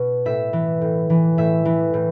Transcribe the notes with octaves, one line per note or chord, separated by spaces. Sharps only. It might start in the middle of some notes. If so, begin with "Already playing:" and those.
Already playing: B2
A2 E5
E3
A2
E3
A2 E5
E3
A2